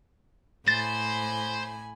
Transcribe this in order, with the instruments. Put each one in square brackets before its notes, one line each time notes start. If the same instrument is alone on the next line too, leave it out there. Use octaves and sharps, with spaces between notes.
[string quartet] A2 G#5 B5 [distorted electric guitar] C5 [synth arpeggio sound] A6